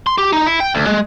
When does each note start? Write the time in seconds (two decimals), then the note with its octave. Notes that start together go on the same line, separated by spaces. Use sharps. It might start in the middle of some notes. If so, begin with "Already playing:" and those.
0.07 C6
0.18 G4
0.33 D#4
0.46 E4
0.60 G5
0.75 D2
0.87 G#3